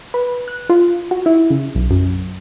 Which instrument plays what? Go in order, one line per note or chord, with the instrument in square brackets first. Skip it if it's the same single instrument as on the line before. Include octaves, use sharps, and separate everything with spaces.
[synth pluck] B4
F#6
F4
F#4
E4
C#3
B1
F#2